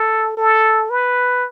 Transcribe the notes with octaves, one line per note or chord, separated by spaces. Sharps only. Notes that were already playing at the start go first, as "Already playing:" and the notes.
Already playing: A4
A4
B4